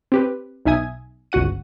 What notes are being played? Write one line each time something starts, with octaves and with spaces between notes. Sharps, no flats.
C4 G4 B4
B1 D#4 E5 G#5 D#6 G#6
G1 C#2 F#4 F#5 D#7